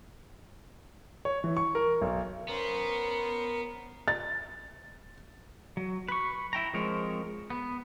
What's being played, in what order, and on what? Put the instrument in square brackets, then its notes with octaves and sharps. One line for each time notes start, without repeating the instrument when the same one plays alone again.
[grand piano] C#5
E3
C#6
A#4
B1
[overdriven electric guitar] B3 [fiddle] C#4 C5 [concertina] A#4
[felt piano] A6
[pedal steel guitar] F#3
B4 C#6
E4 G5 A#5
F3 G#3 C4 A#4 C#5
B3